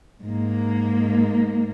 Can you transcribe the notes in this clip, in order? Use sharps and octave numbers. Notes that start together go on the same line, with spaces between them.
G#2 A#3